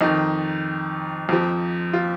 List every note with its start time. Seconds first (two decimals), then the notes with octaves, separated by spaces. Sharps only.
0.01 F2 D#3 D#4
1.29 F2 F3
1.93 F4